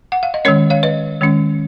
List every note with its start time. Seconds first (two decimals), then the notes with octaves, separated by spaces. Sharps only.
0.12 F#5
0.23 F5
0.34 D#5
0.45 D#3 G#3 C#4 A#4 C#5
0.70 C#5 F5
0.83 B4 D#5
1.21 D#3 G#3 C#4